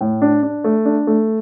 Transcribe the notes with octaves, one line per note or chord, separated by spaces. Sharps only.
A2
D4
D4
A3
D4
A3